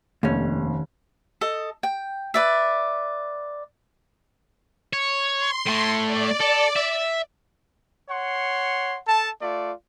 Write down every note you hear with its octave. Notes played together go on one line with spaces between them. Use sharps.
F1 D#2 A#3 C#4
A4 D#5
G5
B4 D5 E5
C#5
C6
A2 A3
D5
A4
E5
C#5 F#5 C6
A4 A5
A3 F4 D5